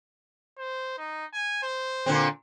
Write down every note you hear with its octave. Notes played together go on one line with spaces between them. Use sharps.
C5
D#4
G#5
C5
A#2 D3 C4